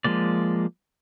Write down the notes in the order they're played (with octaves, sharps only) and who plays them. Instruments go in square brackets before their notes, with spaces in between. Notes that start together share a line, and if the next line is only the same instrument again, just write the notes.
[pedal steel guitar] F3 G#3 A#3 D5